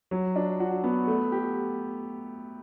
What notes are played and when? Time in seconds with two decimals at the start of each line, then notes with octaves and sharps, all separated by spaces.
0.11 F#3
0.36 D4
0.60 F#4
0.84 B3
1.07 A3
1.32 G4